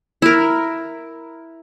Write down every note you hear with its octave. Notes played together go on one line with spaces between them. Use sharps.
E4 A#4